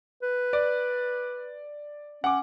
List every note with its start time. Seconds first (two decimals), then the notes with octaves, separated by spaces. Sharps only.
0.22 B4
0.53 D5
2.24 C#4 F#5 D6